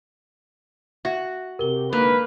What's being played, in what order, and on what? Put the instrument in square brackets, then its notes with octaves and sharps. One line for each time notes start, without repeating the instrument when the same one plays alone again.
[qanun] F#4 [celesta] E5
[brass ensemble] C3 G4 [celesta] A#4 G7
[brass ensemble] G#2 D3 [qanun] A#3 [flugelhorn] B4